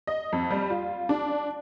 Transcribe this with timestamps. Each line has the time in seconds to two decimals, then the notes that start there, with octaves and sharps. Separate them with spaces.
0.07 D#5
0.32 F2
0.51 G3
0.70 F4
1.09 D4